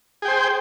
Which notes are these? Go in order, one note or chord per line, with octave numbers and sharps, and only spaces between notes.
G#4 C5 G5